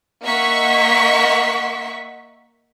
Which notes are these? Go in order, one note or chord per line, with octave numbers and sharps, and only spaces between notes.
A#3 D#5 E5 F#5 C#6 B6